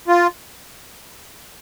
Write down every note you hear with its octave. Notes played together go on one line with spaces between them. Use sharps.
F4